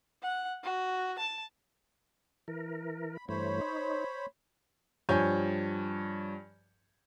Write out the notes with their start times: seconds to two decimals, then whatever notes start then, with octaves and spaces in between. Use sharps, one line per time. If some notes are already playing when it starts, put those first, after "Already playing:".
0.23 F#5
0.64 F#4
1.19 A5
2.48 E3 A#4
3.14 B5
3.29 G2 E3 A3 C5 C#5 B5
3.61 D#4
5.09 G2 F3 C#5 G#5 G6